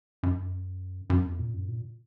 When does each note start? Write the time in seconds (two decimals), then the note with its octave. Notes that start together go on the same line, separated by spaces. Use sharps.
0.23 F#2
1.10 F#2
1.25 E2
1.39 A#2
1.54 F#2
1.68 A#2